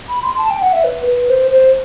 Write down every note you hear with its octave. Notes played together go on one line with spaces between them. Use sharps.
B5
C6
A5
G5
F#5
E5
B4
B4
C5
C5